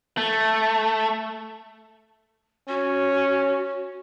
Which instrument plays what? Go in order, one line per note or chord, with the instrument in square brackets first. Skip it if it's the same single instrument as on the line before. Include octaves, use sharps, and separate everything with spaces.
[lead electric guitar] A3
[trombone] C#4 [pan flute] F#4